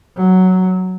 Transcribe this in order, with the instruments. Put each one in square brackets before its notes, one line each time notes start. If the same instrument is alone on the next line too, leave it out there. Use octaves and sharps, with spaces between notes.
[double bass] F#3